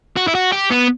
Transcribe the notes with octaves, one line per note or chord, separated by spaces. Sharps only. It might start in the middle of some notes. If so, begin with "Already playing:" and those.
F#4
E4
F#4
G4
B3